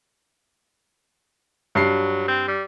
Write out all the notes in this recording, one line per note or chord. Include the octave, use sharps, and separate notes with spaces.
G2 F#3 C7
C4
G3